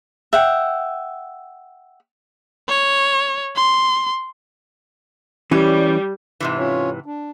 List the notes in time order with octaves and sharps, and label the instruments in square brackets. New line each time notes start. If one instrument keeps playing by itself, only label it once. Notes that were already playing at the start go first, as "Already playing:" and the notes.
[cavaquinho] E5 F#5 G5
[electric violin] C#5
C6
[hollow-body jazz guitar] E3 C#4 [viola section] G3
[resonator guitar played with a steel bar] G#2 C3 E3
[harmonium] C#4 F4 C#5
D4